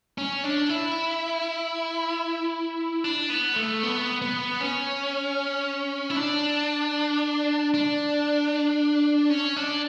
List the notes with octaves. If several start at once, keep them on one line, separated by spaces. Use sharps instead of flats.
C#4
D4
E4
D4
B3
A3
B3
B3
C#4
E4
D4
D4
C#4
D4